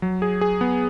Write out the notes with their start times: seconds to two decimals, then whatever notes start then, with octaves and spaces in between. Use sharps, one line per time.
0.02 F#3
0.22 G#4
0.41 G#4
0.61 B3